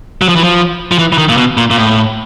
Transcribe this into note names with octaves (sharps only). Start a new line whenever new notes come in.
F#3
F3
E3
F3
F3
E3
E3
D#3
A#2
B2
A#2
A#2
A2